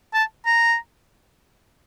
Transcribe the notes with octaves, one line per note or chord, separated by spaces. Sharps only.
A5
A#5